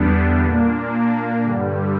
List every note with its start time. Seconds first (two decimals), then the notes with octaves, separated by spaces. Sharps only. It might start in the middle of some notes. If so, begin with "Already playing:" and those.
Already playing: E2 D3 G3 B3 D4
0.44 A#2 A#3 D4
1.44 G2 D3 G3